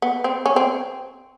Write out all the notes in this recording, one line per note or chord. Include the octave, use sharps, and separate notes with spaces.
B3
C4
C#4
C4